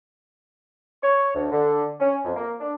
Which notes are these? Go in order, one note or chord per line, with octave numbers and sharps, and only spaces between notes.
C#5
D2
D3
C#4
F2
A#3
D4